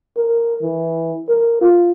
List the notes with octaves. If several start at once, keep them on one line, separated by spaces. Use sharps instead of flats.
A#4
E3
A#4
F4